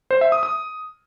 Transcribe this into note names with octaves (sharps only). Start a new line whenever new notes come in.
C5
E5
D#6
D#6